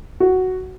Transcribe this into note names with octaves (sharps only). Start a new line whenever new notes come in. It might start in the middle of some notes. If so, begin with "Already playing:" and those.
F#4